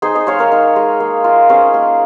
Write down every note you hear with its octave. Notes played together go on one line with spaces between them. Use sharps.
D#4 G#4 C5
C5 D#5
G#3 C#5 F5
A#4 C#5
D#4
G#3
A#3
F4
C#4 G#4 C5
A#3